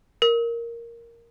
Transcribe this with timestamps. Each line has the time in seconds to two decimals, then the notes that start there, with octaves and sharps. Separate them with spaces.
0.22 A#4